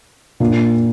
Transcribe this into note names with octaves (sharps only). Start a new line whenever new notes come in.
A#2 A#3 D4